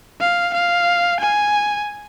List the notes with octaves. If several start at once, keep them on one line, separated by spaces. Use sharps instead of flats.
F5
F5
G#5